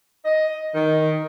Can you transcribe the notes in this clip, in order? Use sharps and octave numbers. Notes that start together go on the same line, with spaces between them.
D#5
D#3